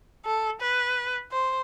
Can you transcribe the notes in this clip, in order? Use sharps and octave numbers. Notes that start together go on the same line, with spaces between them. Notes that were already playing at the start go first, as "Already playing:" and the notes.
A4
B4
C5